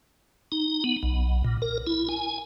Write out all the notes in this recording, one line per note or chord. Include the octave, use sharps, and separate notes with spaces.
D#4
B3
B1
A#2
A#4
E4
G#5